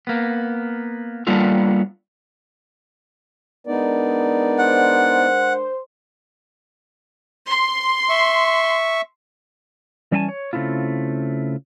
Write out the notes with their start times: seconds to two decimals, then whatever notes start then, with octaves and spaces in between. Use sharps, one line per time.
0.07 A#3 B3
1.27 G3 A#3 B3 D4 F4 A4
3.67 G#3 B3 D4 D#4 A#4 D5
4.59 C5 F#5
7.49 C6
8.09 E5 C#6
10.11 E3 G3 C#4 E5 G#5 A5
10.29 C#5
10.53 C#3 A3 C4 E4 F4